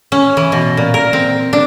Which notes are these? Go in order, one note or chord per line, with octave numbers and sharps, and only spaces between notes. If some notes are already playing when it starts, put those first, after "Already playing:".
C#4
E3
B2
A#2
A#4
C4
D4